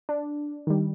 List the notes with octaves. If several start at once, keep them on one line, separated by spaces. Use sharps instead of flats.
D4
D#3 G3